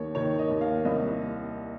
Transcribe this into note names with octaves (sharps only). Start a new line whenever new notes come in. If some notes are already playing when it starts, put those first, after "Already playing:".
Already playing: D#2 D#3 C#5
D#3 C#5
D#5
D#2
F5
C2 D#5